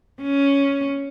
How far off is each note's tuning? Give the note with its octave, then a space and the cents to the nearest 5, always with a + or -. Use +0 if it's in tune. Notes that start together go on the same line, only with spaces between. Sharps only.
C#4 +5